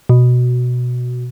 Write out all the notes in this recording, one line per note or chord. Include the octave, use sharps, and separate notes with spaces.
B2